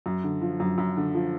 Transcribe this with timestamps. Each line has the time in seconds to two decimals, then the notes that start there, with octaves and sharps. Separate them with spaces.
0.06 F#2
0.24 D3
0.42 F3
0.60 F#2
0.78 F#2
0.97 D3
1.15 F3